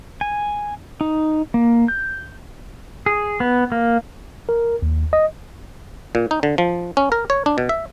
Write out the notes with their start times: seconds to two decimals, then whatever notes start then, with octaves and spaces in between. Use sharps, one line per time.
0.21 G#5
1.01 D#4
1.54 A#3
1.88 G6
3.06 G#4
3.40 B3
3.72 A#3
4.49 A#4
4.82 D#2
5.13 D#5
6.15 A#2
6.31 D#4
6.43 D3
6.58 F3
6.97 C#4
7.12 A#4
7.30 C#5
7.46 D4
7.58 B2
7.69 E5